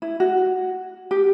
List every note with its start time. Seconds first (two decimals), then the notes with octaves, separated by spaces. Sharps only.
0.02 E4
0.20 F#4
1.11 G4